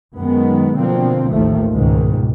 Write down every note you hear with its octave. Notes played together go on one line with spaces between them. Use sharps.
F#2 D#3 G#3 B3
B2 D3 F3 A#3 C4
A1 D#2 D#3 F3 A3
C#2 G#2 B2 D#3